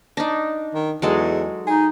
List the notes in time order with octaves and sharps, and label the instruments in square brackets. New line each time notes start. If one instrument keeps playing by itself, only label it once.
[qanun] D4 D#4
[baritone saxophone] D#3
[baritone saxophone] E2 [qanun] F#3 G#3 A4
[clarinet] D#4 [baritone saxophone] G#4